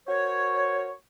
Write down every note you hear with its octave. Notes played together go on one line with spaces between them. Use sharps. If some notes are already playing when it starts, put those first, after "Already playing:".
F#4 A#4 C5 C#5